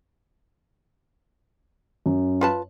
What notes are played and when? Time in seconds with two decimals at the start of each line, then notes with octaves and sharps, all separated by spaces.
2.06 F#2
2.41 F4 B4 A5